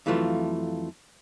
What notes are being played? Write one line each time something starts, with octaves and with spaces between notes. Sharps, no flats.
F2 E3 F#3 A3 F4